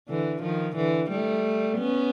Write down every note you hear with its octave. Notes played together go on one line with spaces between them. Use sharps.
D3 E3
D#3 F3
D3 E3
G3 A3
B3 C#4